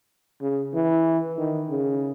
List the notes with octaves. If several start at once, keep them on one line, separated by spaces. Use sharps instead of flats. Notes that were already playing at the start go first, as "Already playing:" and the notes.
C#3
E3
D#3
C#3